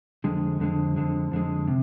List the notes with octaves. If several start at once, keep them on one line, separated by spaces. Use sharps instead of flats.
F2 D3 G#3
F2 D3 G#3
F2 D3 G#3
F2 D3 G#3
C3